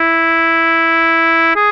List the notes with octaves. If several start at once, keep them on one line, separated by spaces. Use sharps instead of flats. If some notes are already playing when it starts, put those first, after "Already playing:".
Already playing: E4
G#4